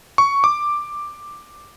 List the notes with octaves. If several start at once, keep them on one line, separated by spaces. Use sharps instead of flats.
C#6
D6